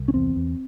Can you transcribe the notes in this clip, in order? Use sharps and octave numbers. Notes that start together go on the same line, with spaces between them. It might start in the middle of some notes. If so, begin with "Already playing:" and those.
Already playing: C2
C#4
E2 C4
E2